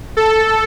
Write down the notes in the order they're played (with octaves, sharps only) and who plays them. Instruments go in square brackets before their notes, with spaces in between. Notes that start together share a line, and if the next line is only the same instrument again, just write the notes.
[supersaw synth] A4